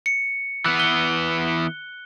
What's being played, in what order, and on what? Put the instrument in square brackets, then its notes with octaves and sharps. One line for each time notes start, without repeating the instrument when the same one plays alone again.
[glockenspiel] C#7
[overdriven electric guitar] E3 B3 [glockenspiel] F#6
[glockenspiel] F#6 G7